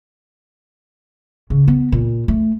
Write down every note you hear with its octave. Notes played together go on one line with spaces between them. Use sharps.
C#3
B3
A#2
A3